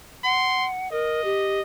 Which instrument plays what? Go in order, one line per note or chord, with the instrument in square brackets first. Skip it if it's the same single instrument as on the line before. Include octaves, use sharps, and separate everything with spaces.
[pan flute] F#5 [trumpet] C6
[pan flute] A#4 [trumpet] D#5
[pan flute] G4